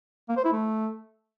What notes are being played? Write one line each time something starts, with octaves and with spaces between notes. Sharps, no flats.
A#3
C5
E4
A3